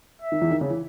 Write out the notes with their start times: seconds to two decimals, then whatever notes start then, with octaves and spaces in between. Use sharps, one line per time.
0.22 E5
0.32 D#3
0.41 E2 E3
0.51 D#3
0.61 C#3
0.70 E3